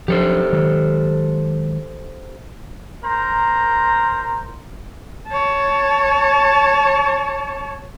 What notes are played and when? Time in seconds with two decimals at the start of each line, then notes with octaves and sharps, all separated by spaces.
0.08 F3 F#3 D4 G4 A4 C5
0.53 D#3 F#3 G#3
3.03 A#4 C5 A#5
5.29 C#5 A5